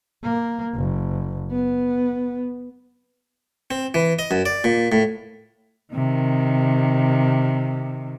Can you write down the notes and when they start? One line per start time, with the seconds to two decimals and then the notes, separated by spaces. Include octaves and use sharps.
0.23 A#3
0.74 F#1
1.51 B3
3.71 C4
3.94 E3
4.19 D#5
4.31 F#2
4.46 D5
4.64 A#2
4.92 A2
5.93 C3 D#3